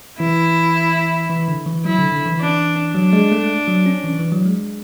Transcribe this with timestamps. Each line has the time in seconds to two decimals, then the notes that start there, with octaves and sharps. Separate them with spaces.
0.20 E3 E4
1.30 E3
1.48 D3
1.66 E3
1.85 F#3 E4
1.99 D3
2.12 D3
2.26 E3
2.40 D4
2.94 F#3 D4
3.13 G#3
3.32 A3
3.68 F#3
3.86 C#4
4.04 E3
4.19 E3
4.32 F#3
4.46 G#3